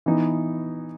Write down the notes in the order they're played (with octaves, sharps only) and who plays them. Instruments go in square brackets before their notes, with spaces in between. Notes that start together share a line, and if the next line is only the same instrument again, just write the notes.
[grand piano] E3 B3 D#4